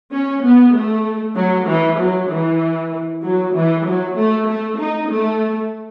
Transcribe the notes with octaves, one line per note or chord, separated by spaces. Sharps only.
C#4
B3
A3
F#3
E3
F#3
E3
F#3
E3
F#3
A3
A3
D#4
A3